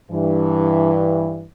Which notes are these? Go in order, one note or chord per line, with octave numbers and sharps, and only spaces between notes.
G2 E3